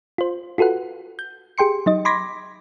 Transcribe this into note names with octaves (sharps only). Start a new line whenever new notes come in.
F4 C5
F4 F#4 A4 B4 F#5
G6
G4 G#4 G5 C6 C#7
F#3 D#4 D#5
B5 C6 D6 G#6 A#6 B6